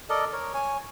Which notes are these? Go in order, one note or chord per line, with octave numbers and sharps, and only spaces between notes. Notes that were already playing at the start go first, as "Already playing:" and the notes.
A4 A#4 D5 D#5
A#4 C#5
C#5 G#5